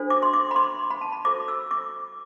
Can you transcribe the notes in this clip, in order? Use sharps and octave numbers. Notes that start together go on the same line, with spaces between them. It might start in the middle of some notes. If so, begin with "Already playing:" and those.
Already playing: D4 F#4 A4 C5
D6
C6
D6
B5
C6
B5
A5
B5
F#4 A4 C5 D6
E6
D6